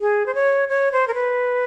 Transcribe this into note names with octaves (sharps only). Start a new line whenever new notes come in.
G#4
C5
C#5
C#5
C5
A#4
B4